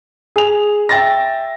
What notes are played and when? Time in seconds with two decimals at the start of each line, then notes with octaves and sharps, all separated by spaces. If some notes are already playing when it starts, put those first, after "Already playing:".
0.36 G#4 F7
0.89 E5 G5 A6 A#6